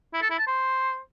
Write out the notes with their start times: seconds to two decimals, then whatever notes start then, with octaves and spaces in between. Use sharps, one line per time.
0.13 E4
0.22 A4
0.30 E4
0.39 A5
0.47 C5